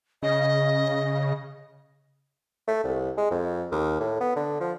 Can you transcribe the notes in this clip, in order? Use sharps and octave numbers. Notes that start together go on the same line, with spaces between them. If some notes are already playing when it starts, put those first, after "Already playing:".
C#3 D#5
A3
C2
G#3
F2
D#2
A2
B3
D3
F3